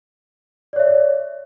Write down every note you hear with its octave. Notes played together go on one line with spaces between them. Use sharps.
C#5 D5 E5